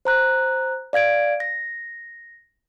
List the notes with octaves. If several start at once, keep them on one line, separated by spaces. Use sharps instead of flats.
C5 A#5 F#6
D5 F5 G#6 D7
A#6